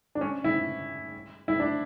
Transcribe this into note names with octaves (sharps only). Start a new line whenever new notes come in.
D4
C#4
E4
E4
D4